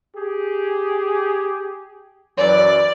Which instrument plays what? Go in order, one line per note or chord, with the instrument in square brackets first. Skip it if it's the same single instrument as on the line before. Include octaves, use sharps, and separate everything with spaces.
[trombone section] G4 G#4
[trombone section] F#2 E3 [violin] D5